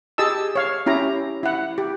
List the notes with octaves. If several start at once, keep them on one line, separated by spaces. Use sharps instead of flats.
G4 G#4 D#5 A5 E6
C#5 F5
C#4 E4 G4 A#5
E4 F#5
G4